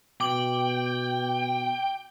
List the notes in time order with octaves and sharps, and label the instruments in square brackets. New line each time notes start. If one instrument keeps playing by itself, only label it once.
[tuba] B2 [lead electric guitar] G5 [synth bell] D6 F#7